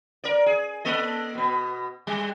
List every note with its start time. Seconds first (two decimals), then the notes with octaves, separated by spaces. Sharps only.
0.24 A#4 D5
0.46 G#4
0.85 A#3 A4 D#5
1.35 B2 B3
2.07 G3